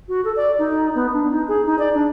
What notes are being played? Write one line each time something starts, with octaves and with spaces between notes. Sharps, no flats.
F#4
A4
D5
D#4
B3
D4
D#4
G#4
D#4
D5
D4